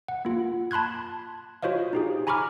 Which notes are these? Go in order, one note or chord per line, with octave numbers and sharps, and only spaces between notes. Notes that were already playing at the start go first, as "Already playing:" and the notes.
F#5
A#3 F4
A5 B5 C6 F#6 G#6
F4 F#4 C5 C#5 D#5 F5
D#4 G4 G#4
G#5 A#5 B5 C#6 D6 F6